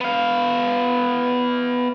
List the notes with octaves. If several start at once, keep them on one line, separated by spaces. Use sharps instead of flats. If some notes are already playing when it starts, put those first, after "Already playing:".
B3 F5